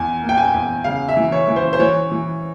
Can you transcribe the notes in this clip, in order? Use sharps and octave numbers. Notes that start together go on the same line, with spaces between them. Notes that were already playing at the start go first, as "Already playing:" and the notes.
Already playing: E2 G#5
A#3
G5
G#5
E2
C#3 F5
E5
E3
C#5
E3
C5
C5
E3 C#5
E3